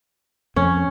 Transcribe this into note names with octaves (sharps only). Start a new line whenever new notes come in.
F2 C#4